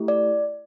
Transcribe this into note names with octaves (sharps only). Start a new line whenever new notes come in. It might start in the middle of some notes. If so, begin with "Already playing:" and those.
Already playing: A3 E4 G4
D5